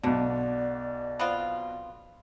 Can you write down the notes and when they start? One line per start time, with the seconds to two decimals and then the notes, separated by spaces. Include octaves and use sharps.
0.03 B1 B2 D3 D5
1.19 B3 C4 F4